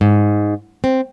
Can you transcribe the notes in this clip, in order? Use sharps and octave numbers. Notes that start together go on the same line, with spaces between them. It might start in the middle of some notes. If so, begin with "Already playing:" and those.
G#2
C4